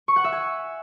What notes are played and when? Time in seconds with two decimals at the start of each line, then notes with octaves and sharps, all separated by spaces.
0.08 C#6
0.16 F#5
0.24 E5
0.32 G#5